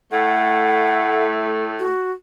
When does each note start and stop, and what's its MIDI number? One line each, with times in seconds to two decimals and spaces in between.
0.12 1.88 45
0.12 1.88 57
0.12 1.24 78
1.79 2.12 66